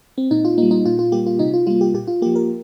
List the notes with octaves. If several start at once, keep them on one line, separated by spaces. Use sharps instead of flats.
C4
A#2 D#4
F4
G3 A#3 D#4
D#4
A#2 F4
F4
G3 A#3 G4
F4
C3 D#4
F4
G3 A#3 F4
G4
A#2 G4
F4
F3 A#3 G4
A#4